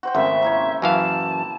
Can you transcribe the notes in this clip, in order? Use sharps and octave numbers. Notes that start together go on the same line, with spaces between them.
F#4 C5 G5
G#1 C#3 F3 A3 E5
A#3 E4 C#5
F#2 E3 F5 A5